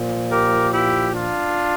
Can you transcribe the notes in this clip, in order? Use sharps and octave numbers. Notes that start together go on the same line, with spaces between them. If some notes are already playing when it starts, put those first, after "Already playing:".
Already playing: A#2 F3
G4 A#4
E4 G4
D4 F4